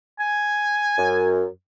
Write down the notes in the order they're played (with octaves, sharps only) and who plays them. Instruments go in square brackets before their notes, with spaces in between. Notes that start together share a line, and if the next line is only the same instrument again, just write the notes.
[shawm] G#5
[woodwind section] F#2